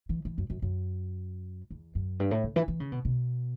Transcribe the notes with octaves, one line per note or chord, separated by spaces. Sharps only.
E3
E3
F#2
F#2
F#2
E2
F#2
G2
A2
C#3
E3
E3
C#3
B2
B2